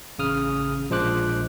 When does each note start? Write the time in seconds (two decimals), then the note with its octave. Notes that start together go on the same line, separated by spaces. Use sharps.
0.18 A1 C#3 D#6 F6
0.90 A#1 F3 G#3 C5 D6 F#6